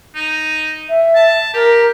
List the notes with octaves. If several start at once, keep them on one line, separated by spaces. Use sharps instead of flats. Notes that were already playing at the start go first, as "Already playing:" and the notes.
D#4
E5
A5
G4 A#4